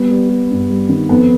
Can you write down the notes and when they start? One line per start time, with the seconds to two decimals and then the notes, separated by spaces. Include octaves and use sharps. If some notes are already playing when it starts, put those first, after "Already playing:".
Already playing: G3 B3
0.10 G3
0.29 G3
0.50 G2
0.70 G3
0.89 D#3
1.09 F2 B3